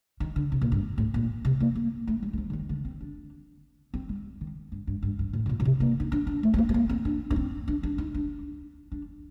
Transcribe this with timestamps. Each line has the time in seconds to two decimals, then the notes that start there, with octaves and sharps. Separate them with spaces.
0.20 D#3
0.36 D3
0.52 C3
0.61 A#2
0.72 G2
0.98 A2
1.14 A#2
1.45 C3
1.60 A#3
1.75 A#3
2.08 A3
2.23 G3
2.33 G3
2.38 F3
2.50 D3
2.53 D#3
2.69 D3
2.85 C4
3.01 D4
3.94 C4
4.09 G3
4.41 D#3
4.72 G2
4.87 G2
5.03 G2
5.19 G2
5.33 A2
5.46 C3
5.49 A#2
5.60 A#2
5.65 C3
5.80 A#3
6.00 D#4
6.12 D4
6.27 D4
6.43 A3
6.54 C4
6.58 A#3
6.69 A3
6.74 A#3
6.89 C4
7.05 D4
7.31 D4
7.36 C4
7.68 D4
7.83 D4
7.98 D#4
8.14 D4
8.92 D4